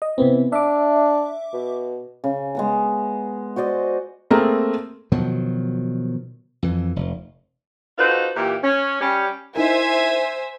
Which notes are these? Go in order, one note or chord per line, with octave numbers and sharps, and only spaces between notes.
D#5
C3 E3 B3 C4
D4 E5 D6
B2
C#3
G#3 B3 A#5
F#4 C5 D5 D#5
A3 A#3 C4 G#4 A#4
B2 D#3 F3 F#3
F2 E3
F1
D#4 F4 F#4 A4 B4 C5
A#2 E3 G4
C#4
G3 C#4
D#4 E4 A#4 C5 E5 G#5